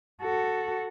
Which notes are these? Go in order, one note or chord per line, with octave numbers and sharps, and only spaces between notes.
F#4 A4